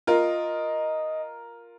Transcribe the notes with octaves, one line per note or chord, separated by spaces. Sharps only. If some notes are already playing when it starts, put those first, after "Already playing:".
F4 A#4 D#5